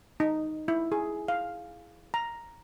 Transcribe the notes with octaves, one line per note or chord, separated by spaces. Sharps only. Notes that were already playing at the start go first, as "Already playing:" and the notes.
D#4
E4
G#4
F5
A#5